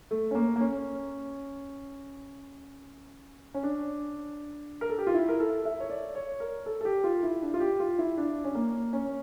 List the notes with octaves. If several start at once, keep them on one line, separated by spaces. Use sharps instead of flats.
A3
C#4
A#3
A#3
C#4
C#4
D4
A#4
A4
G4
F4
E4
A#4
A4
E5
C#5
D5
C#5
A#4
A4
A4
G4
F4
E4
D4
F4
G4
F4
E4
D4
C#4
A#3
C#4